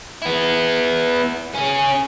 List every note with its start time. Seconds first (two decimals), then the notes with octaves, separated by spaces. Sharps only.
0.22 B3 E4
1.55 C#4 G#4